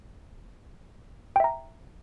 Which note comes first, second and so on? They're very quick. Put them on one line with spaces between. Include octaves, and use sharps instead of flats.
G5 E5 A#5